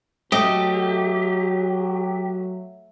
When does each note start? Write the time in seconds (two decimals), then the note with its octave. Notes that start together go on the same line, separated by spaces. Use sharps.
0.32 F#3 A3 G4 D#5